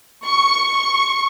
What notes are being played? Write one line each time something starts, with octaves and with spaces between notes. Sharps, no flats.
C#6
C#6